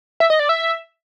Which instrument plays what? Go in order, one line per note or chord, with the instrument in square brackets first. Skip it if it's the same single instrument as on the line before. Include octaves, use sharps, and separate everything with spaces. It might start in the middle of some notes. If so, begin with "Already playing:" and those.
[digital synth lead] E5
D#5
D5
E5